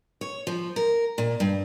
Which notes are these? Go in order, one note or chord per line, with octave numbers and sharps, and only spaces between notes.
C#5
F3
A#4
A#2
G2